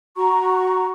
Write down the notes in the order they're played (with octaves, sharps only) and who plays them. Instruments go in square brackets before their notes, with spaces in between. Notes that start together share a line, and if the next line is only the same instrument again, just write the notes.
[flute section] F#4 A#5 C#6